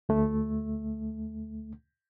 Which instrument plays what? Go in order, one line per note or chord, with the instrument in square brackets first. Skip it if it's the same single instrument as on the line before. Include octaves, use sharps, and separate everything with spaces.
[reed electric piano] D2 A3